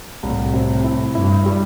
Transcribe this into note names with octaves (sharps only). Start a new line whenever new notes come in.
C2 A2
C3
E4
G2 E4
G3